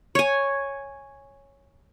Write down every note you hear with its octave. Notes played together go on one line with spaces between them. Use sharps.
C#5 G#5